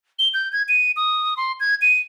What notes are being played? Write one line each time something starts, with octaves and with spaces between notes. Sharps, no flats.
G7
G6
G#6
D#7
D#6
C6
G#6
D#7